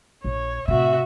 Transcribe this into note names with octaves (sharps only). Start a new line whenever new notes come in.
A#1 C#5
A2 C3 F#4 E5